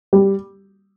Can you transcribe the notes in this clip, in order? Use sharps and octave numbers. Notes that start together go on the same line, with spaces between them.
G3